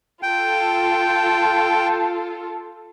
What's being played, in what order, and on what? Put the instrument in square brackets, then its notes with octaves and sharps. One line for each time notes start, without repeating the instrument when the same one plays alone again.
[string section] F4 A4 [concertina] G5